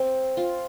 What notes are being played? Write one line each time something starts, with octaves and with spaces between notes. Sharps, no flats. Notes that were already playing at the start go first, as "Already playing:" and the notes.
Already playing: C4
F4